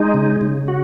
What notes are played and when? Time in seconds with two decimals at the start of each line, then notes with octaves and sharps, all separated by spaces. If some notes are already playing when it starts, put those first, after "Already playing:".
Already playing: G#3 D#4
0.14 C#3
0.41 C#3
0.68 F#4